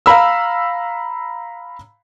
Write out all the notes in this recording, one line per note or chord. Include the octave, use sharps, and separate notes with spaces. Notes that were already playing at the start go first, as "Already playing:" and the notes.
F5 A#5 B5 E6